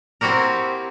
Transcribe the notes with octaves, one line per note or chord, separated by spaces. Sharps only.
C4 E4 F#4 G4 A#4